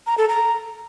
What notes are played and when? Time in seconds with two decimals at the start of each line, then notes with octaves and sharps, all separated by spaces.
0.07 A#5
0.18 A4
0.29 A#5